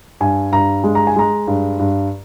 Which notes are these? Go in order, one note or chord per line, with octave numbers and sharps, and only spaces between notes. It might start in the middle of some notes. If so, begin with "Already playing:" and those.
G2 G#5
G2 A#5
G#3
A#5
G#5
G#3 A#5
G2
G2